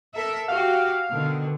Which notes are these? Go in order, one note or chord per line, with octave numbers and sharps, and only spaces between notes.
A4 A#4 E5
F#4 G4 F5
B2 D3 D#3